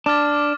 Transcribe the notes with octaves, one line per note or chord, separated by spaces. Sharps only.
D4 D6 F6 A6